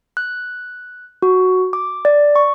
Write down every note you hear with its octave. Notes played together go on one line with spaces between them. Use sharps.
F#6
F#4
D6
D5
C#6